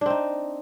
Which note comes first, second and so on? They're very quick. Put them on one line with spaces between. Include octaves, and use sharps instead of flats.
D4 C4 D#4